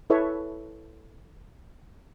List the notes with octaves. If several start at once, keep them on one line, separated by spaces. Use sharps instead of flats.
E4 A4 B4 C#5 E5